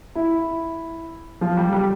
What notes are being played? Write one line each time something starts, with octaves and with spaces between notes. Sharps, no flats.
E4
F3 F4
G3 G4
G3 G4